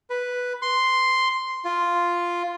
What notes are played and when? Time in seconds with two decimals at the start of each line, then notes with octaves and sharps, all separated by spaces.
0.10 B4
0.62 C6
1.65 F4